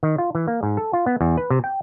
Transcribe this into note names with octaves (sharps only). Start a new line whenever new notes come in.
D#3
F4
E3
A#3
G#2
A4
F4
B3
E2
B4
C3
G5